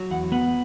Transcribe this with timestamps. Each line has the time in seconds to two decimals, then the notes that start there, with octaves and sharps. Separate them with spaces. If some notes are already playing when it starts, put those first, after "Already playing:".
Already playing: F#3
0.11 E2 F#5
0.32 B3 F#5